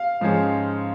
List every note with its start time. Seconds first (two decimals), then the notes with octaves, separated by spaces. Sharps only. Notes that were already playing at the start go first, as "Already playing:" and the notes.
Already playing: F5
0.21 G#2 F3 G#3 C#4